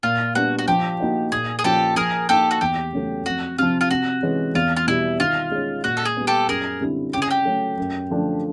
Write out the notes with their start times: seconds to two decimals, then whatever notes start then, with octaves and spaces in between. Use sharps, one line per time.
0.03 A#2 F4
0.35 G3 B3 D4 F#4
0.59 F#4
0.68 F3 G4
1.00 A#3 D#4 F#4
1.32 A#2 G#4
1.59 G#4
1.64 F3 A#3 C#4 F4 G4 A4
1.96 F3 G#4 A#4
2.29 A#3 D#4 G4 A4
2.51 F#4
2.61 E2 G4
2.93 C#3 F#3 A3
3.26 F2 F#4
3.58 C3 F3 F4
3.81 F4
3.91 C3 F#4
4.22 E3 G#3 C#4
4.55 E2 F4
4.76 F4
4.87 B2 G3 E4
5.19 D#3 F4
5.52 G#3 C#4
5.84 A#2 F#4
5.97 A4
6.05 G#4
6.17 G3 B3
6.27 G4 A4
6.48 F#2 G#4 A#4
6.81 D3 G3 C4 E4
7.13 C#3 G4
7.22 G#4
7.31 G4
7.45 F#3 A3
7.77 F#2
8.10 D3 F3 A3 D4